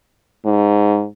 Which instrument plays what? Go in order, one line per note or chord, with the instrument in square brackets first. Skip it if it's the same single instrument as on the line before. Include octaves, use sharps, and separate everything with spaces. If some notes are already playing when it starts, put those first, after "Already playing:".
[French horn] G#2